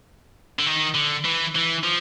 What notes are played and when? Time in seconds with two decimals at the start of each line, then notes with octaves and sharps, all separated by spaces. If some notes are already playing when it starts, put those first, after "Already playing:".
0.59 D3
0.66 D#3
0.95 D3
1.25 E3
1.55 E3
1.84 F3